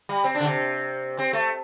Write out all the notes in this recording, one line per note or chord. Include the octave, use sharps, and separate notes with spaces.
G3
C4
D4
D3
C3
C4
A3